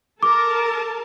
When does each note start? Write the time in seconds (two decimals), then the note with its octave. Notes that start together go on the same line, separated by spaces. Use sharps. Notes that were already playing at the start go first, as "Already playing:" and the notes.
0.23 A4 A#4 A5 D6